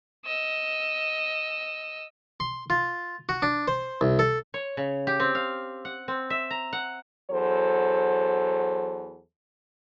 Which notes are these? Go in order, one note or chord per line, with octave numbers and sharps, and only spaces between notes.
D#5 E6
C6
F4
F#4
D4
C5
C2
A4
C#5
C#3
G4
C4
F5
F#5
C4
E5
A#5
F#5
E2 F#3 A4 C5